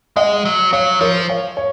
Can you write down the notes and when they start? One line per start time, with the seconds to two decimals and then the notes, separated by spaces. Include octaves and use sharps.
0.16 G#3 D#5 F#5
0.45 F#3
0.73 F#3 C#5 F5
1.01 F3 A#4 C#5
1.29 C#5 F5
1.57 C#5